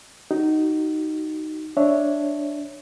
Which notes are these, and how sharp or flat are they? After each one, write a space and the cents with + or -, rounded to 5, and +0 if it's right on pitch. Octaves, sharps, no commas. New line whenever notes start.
D#4 +0 F#4 +35
D4 +0 C#5 +0 E5 +0